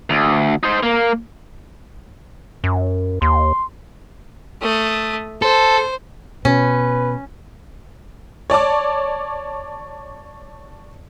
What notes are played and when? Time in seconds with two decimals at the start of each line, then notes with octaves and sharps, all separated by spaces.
0.10 D2
0.63 D#4 C5
0.83 A#3
2.64 F#2
3.22 D#2 C6
4.62 A3 D#6
5.42 A4 C5
6.45 B2 C#4 B4
8.50 C#5 D5 A5 D6